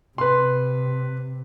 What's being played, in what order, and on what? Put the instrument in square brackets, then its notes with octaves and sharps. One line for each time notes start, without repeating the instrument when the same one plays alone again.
[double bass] C3 [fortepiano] B4 C6